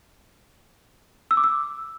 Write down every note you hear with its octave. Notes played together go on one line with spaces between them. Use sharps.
E6
D6
E6